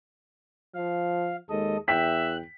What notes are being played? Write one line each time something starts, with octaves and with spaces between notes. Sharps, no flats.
F3 F5
D#2 G#3 A4 D#5
E2 E5 G5 F#6 B6